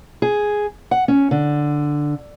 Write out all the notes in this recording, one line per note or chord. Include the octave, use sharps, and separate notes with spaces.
G#4
F#5
C#4
D3